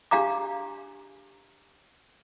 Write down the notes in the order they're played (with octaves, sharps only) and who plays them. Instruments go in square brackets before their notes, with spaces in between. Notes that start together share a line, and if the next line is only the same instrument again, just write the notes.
[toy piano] D4 G4 F5 A#5 D6